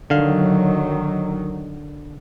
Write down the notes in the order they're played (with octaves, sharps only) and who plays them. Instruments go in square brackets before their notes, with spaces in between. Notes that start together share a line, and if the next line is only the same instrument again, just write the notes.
[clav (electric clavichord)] D3 F5 [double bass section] D#3 F#3